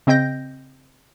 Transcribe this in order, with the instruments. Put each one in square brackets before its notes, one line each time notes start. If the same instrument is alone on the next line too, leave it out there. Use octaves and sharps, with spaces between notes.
[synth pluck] C#3 C4 D#5 G5 G6 A#6